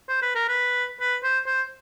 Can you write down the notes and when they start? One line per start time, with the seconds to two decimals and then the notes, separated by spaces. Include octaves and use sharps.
0.09 C5
0.22 B4
0.35 A#4
0.48 B4
1.00 B4
1.23 C5
1.46 C5